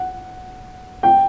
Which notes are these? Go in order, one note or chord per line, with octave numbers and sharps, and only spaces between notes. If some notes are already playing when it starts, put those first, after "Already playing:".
Already playing: F#5
G5